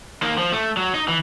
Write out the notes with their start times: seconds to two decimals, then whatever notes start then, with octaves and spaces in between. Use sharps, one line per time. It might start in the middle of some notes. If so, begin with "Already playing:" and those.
0.22 A#3 D#4
0.38 F3
0.52 A3
0.77 F#3
0.94 D#4
1.08 E3